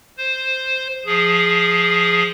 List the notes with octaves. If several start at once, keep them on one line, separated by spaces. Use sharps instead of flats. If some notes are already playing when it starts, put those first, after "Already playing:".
C5
F3 G#4